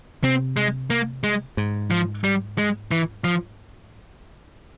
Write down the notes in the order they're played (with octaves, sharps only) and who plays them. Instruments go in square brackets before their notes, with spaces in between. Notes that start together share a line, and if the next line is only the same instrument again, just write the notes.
[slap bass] C3 [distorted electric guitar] C4
[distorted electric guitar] G#3
A#3
G#3
[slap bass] G#2
[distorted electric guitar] F3
G3
G#3
E3
F3